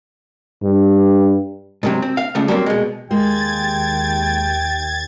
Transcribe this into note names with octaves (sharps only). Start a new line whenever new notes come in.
G2
G#2 C3 F#3
C4
F5
C#2 C#3 A3
F#3 G3 A#3 C4
B2 G#3
D#2 G#3 A#3 G5 G#6 A6